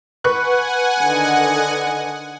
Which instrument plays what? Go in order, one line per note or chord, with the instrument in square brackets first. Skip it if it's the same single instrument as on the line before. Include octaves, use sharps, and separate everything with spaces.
[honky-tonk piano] B4 C#6 F#6 [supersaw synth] F#5 G#5
[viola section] D3 D#3 D#5